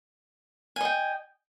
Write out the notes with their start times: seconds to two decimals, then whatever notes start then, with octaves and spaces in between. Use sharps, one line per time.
0.76 G#5
0.81 D#5
0.85 G5